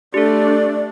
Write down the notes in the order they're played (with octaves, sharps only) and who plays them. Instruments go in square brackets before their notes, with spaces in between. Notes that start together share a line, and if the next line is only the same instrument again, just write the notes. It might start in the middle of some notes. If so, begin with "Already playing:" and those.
[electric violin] A3 D4 [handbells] G4 A4 [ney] D5